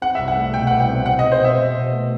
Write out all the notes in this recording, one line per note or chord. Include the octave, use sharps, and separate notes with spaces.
C4 F#5
E5
C2
F#5
A3
B2 G5
F#5
C2
G5
C4
B2 F#5
D#5
C4
C5
B2 E5
B2
B2
A3